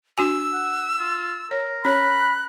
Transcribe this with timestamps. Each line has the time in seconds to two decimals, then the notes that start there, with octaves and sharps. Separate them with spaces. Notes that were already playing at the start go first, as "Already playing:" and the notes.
0.18 D4 F#4 G#5 E6
0.53 F#5
0.99 F4
1.51 A#4 C#5
1.85 C#4 C#5 B5 F#6